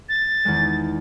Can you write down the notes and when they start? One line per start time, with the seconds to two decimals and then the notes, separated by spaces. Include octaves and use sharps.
0.09 A6
0.45 E2 D#3 G#3